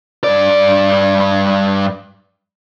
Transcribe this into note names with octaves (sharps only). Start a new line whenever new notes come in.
G2 D5